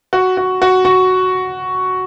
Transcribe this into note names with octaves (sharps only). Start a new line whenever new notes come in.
F#4
F#4
F#4
F#4